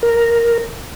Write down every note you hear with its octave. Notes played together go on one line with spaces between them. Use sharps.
A#4